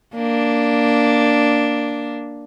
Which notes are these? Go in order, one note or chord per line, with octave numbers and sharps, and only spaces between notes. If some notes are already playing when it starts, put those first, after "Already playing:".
A#3 D4